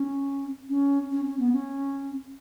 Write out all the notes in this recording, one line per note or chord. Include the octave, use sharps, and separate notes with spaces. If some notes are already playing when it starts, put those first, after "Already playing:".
Already playing: C#4
C#4
C#4
C#4
B3
C#4